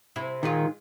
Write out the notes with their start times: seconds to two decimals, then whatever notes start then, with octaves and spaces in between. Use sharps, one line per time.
0.16 C3 E4
0.43 A#2 D#3 G#3 F4